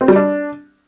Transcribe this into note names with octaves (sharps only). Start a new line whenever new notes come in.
C4
G3
D4